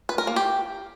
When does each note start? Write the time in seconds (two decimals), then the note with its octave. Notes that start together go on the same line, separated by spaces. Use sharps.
0.09 B4
0.18 A#4
0.27 A#3
0.36 G4